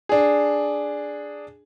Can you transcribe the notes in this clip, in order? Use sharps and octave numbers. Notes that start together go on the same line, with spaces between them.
D4 G#4